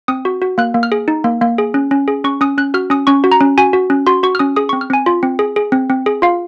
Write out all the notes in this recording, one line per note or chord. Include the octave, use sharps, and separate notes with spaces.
C4 D#6
F#4
F#4
A#3 F#6
A#3
F6
G#4
D#4
A#3
A#3
G#4
C#4
C#4
G#4
C#4 C#6
C#4 D#6
C#4 F#6
F#4 F6
C#4 D#6
C#4 C#6
F#4
A#5
C#4
F#4 G#5
F#4
C#4
F#4 C6
F#4 C#6
F6
C#4 D#6
G#4 D#6
C#6
C4
F6
C4 G#5
F4
C4
G#4
G#4
C4
C4
G#4
F4 F5